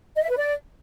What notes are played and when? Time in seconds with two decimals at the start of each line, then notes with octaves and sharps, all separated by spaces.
0.16 D#5
0.23 E5
0.30 B4
0.37 D5